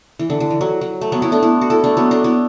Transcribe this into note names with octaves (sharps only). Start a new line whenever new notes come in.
E3
D3
D3
E3
F#3
F#3
A3
F#3 B3
B3 E4
A3 D4
B3 E4
F#4
E4 A4
A3 D4
F#3 B3
A3 D4
B3 E4